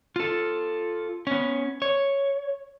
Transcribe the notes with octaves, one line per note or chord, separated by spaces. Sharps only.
F4 A4
B3 C#4
C#5